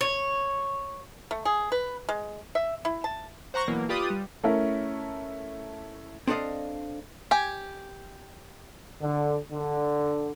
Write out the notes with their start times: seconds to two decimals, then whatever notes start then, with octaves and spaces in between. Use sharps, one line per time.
0.01 C#5
1.31 A3
1.45 G#4
1.72 B4
2.09 G#3
2.55 E5
2.85 E4
3.04 A5
3.54 C5 F#5 A#5 C#6 A#6
3.68 B2 E3 F#3 A#3
3.89 F4 G4 B4 D5 D#6
4.10 G3
4.43 A3 C#4 E4 A#4
6.27 C4 D4 A4 D5 D#5 F5
7.31 G4 G#5
9.01 D3
9.52 D3